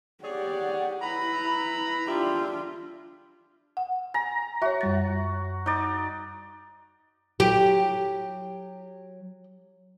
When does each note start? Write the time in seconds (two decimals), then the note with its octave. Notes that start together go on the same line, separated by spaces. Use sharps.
0.24 G4 G#4 C#5 D5 F#5
1.02 E4 B4 A#5 B5
2.08 D4 F4 G4 E5
3.77 F#5
4.14 G#5 A#5
4.62 F#4 C#5 E5
4.81 F#2 G3 A6
5.66 D#4 D5
7.40 F#3 G4